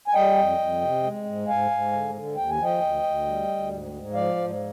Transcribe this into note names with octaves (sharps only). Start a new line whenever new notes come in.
G#5
G3 D#5 G5
F2
F2
C3
G#3
G#2
G#2 F5 G#5
G#2
D3
D3
D#2 G5
G#5
F3
D#5 G5
D2
D2
G3
D2
G#2
G#2
F3 D5 F5
G#2